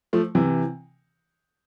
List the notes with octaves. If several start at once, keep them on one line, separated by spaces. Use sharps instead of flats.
F3 A3
C3 E3